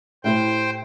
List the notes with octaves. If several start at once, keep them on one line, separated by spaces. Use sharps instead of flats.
A2 E4 G4 C5 G5